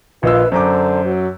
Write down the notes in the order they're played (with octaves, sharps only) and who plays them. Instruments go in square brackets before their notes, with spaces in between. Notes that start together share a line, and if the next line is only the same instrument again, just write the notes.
[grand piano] A#1 D#5 E6 [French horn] F4 [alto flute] B4
[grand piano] F#2 A#5 D6 [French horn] D3 [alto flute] C5
[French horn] F#3